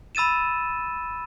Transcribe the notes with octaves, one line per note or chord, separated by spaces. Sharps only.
B5 E6 A6 D#7 E7